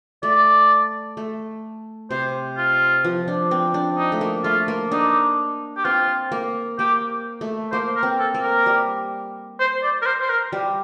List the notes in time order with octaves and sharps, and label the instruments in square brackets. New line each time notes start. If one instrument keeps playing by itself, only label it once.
[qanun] A3 [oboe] D5
[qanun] A3
[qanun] C3 [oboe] C5
[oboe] F4
[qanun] F3
D4
C4
D4
[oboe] D#4
[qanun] A3
A#3
[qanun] A3 [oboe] F4
[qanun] A#3
[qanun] D4 [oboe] D#4
[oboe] G4
[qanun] C4 [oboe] F4
[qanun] A#3
[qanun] A#3 [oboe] G4
[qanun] A3
[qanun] A#3 [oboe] C5
[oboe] A#4
[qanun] C4
[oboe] A4
[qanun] A#3
[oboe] A#4
[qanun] G3
[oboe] C5
D5
A#4
C5
C5
A#4
[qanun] G3